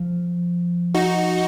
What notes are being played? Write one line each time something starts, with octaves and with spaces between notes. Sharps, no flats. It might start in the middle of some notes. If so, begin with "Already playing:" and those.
Already playing: F3
D#4 F#4